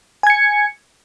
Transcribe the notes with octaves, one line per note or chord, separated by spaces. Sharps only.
G#5 G#6 C#7